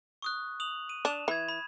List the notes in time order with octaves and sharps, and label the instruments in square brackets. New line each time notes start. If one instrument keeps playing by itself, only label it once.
[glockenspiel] C#6 D#6 F#6
D#6 F7 F#7
D#7
[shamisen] D4 [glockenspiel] E7 F7
[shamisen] E3 [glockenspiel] B5 G#6
[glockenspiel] B5